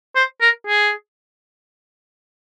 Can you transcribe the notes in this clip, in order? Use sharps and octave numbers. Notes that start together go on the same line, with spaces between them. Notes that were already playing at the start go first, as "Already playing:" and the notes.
C5
A#4
G#4